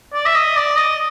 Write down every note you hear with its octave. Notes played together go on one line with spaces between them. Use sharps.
D5
E5
D#5
D5
D#5